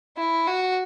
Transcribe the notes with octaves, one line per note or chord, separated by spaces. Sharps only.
E4
F#4